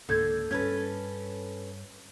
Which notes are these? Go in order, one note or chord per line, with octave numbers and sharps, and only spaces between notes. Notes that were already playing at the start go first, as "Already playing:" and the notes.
C#2 G#2 D3 A#3 A4 G6 G#6
G2 C#4 A4 B4 G#6